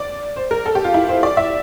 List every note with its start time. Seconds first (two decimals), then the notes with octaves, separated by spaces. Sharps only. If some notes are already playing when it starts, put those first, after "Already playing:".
Already playing: D5
0.36 C5
0.51 A#4
0.66 A4
0.75 G4
0.84 F4
0.94 E4
1.09 C5
1.23 D5
1.37 E5